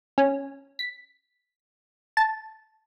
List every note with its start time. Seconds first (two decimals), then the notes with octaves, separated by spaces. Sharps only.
0.18 C#4
0.79 B6
2.17 A5